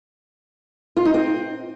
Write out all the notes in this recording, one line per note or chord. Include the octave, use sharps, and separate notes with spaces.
F4
D#4
C4